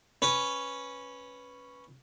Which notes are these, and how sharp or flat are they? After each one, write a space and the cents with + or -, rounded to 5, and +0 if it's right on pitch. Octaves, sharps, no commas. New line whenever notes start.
C#4 +0 B4 +0